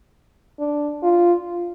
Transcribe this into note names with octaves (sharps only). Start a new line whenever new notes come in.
D4
F4